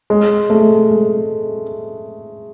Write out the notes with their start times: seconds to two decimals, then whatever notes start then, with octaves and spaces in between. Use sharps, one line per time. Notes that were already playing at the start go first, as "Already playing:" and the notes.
0.10 G#3
0.50 A3
0.90 G#3